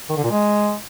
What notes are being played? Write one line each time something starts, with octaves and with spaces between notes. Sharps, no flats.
D#3
D3
A#2
G#3